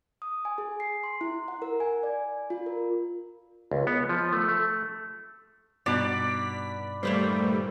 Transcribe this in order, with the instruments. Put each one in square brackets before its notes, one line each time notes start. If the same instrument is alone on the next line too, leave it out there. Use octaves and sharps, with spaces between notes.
[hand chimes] D#6
G#5
G#4
C7
C6
E4
F#5
A#4
G#5
D5
F4
A#4
[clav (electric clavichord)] C#2
B3
F3
A3
A3
[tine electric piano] G2 D#4 F#6 [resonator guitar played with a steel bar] B2 [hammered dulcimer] D5 [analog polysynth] B6
[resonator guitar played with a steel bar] A#2 B4 C5 [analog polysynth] D#3 G3 A3